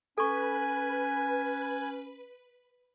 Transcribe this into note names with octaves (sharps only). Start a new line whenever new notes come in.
C#4 A4 B4 G#5 C#6